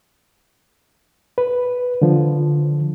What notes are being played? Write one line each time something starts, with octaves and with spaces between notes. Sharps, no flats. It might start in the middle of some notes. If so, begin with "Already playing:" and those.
B4
D3 F3